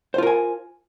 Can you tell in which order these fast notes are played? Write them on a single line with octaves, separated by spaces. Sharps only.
C5 F4 A#4 G#5